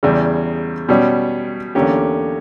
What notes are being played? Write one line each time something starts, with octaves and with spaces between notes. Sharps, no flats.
E2 C#3 G3
B2 G3 C#4
E2 D3 A#3 C#4 G4